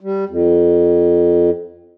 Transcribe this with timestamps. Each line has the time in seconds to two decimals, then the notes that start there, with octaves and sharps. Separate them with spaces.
0.01 G3
0.29 F2